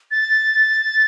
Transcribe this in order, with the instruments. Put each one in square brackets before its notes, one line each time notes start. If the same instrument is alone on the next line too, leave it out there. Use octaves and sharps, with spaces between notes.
[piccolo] A6